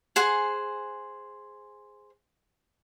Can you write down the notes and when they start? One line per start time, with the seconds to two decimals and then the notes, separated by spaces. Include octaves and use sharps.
0.16 G#4 C5 F#5 G#5